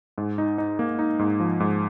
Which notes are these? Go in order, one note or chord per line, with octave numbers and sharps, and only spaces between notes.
G#2
D#4
D#4
A#3
D#4
G#2
F3
G#2